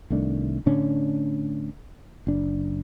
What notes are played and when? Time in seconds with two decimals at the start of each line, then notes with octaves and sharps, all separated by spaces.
0.10 C2 D#3 A3 D4
0.66 A2 D3 C#4 D4
2.27 F#1 D4